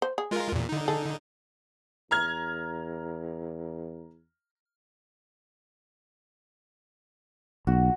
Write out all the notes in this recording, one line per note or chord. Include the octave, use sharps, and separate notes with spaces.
C5
G#4
G#3 F4 A#4
E2 A#2
D3 D#4
G#4 A4
E2 A#5 F6 G#6
B1 F#4